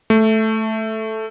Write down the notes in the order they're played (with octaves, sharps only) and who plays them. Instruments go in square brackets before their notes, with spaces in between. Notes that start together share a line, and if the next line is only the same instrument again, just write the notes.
[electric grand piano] A3